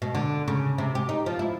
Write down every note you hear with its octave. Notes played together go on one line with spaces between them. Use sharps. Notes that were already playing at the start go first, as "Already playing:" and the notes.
B2
D3
C#3
C3
G4
D#4
F3
E4